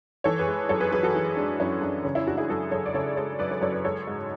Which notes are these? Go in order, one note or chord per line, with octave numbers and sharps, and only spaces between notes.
E3 A4 C#5
G#4 B4
G#3
F#2 A4 C#5
G#4 B4
F#2 G#4 B4
F#4 A4
E3
G#3 D4
F#2 C#4 E4
F#2 D4
C#3 C#4
C#4 E4
G#3 D4 F#4
E4 G#4
F#2 F#4 A4
F#2 A4 C#5
D5
C#3 A4 C#5
G#3 A4 C#5
F#2 B4 D5
A4 C#5
F#2 A4 C#5
B4 D5
G#3 A4 C#5
G#2